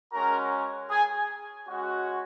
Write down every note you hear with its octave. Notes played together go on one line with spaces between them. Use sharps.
G#3 C#4 F#4 A#4 A#5
G#4 G#5
G#3 C#4 F#4